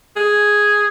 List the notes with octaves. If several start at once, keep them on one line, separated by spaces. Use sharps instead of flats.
G#4